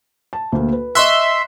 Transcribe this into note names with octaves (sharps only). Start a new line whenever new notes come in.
A5
D2 A#3
B4
D#5 E5 C6 C#6 F#6